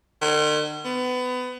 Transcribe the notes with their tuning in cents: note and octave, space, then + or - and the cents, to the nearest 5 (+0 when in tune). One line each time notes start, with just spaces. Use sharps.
D#3 -45
B3 +25